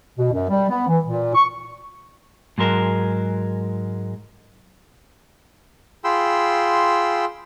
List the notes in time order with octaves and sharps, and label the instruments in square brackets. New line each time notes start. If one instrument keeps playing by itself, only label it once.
[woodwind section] B2
F#2
G3
B3
E3
A#2
C#6
[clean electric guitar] G#2 F#3 G#3 A#4 A5
[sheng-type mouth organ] F4 G#4 G5 B5 C6 E6